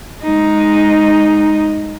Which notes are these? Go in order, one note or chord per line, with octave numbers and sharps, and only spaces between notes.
G#3 D#4